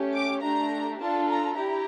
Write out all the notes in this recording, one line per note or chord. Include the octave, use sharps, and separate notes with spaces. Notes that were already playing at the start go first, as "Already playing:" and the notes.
Already playing: A3 C#4 G4
D6
A3 D4 G4 A#5
D4 F4 A4 A5
A#5
E4 G4 A#5